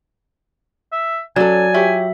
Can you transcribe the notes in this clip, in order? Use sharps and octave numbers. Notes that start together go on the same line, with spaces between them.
E5
F#3 C#4 A4 D5 G#5
F4 G4 C#5 E5